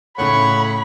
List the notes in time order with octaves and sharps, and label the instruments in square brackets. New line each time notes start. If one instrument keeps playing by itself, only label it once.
[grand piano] A2 C#3 A3 [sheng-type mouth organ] C#5 F#5 C#6 [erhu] B5